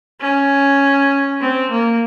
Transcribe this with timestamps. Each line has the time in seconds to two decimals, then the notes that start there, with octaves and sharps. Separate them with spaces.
0.21 C#4
1.41 C4
1.71 A#3